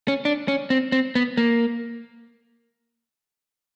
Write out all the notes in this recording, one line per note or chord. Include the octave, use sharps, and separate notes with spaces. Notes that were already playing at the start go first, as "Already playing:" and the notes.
C#4
D4
C#4
C4
C4
B3
A#3